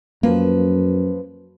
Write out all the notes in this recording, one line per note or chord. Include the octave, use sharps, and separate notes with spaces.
F#2 F3 A#3 B4